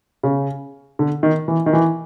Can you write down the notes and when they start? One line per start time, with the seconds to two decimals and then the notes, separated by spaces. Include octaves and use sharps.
0.23 C#3
0.99 D3
1.23 D#3
1.48 E3
1.66 D#3
1.73 E3